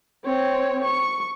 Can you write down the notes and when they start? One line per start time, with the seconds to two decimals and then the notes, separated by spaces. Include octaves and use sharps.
0.25 C4 C#5
0.84 C#6